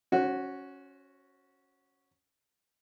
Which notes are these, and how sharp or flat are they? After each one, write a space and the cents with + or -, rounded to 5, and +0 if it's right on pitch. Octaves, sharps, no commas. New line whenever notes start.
C#4 +0 F#4 +0 C5 +35